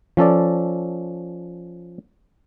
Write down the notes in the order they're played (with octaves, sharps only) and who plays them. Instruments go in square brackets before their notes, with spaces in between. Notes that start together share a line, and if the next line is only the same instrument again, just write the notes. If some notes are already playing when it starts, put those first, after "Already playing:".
[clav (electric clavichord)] F3 C#4 A4 D5